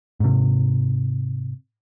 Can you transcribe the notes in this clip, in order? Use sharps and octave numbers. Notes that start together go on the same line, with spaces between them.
G#2 C3